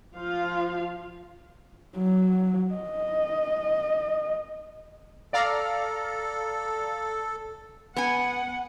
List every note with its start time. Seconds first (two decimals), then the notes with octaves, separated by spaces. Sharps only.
0.14 F3 F4 F5
1.97 F#3
2.74 D#5
5.33 A4 D5 F5 A#5
7.96 B3 F#5 G#5